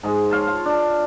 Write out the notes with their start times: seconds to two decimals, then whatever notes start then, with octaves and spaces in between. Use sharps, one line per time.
0.03 G#2 G#3
0.30 C#5 F5 A5 C6
0.47 F4
0.65 D4